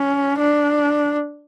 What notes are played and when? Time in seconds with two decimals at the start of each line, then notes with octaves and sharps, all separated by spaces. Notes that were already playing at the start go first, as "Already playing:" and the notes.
Already playing: C#4
0.38 D4